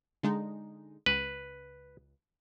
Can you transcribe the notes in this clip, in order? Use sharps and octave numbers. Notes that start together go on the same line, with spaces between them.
D3 G#3 D#4
C#2 B4